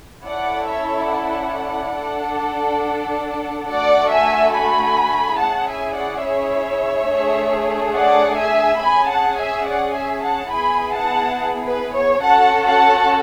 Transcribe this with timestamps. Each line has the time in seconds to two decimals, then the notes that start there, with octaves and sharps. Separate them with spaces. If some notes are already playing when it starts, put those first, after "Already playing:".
0.24 C#4 E4 A4 D5 F#5
0.67 C#5 E5
1.10 D5 F#5
1.96 D4 A4
3.67 A3 D4 F#4 A4 D5 F#5
4.09 E5 G#5
4.52 G#5 B5
5.38 C#4 E4 G#4 F#5 A5
5.67 E5 G#5
5.95 D5 F#5
6.23 C#5 E5
7.10 A3 D4 G#4
7.95 D5 F#5
8.38 E5 G#5
8.80 C#4 G#4 G#5 B5
9.09 F#5 A5
9.38 E5 G#5
9.66 D5 F#5
9.95 E5 G#5
10.23 F#5 A5
10.52 B3 E4 G#4 G#5 B5
10.95 F#5 A5
11.66 B4
11.95 C#5
12.23 C#4 F#4 A4 F#5 A5
12.66 F#5 A5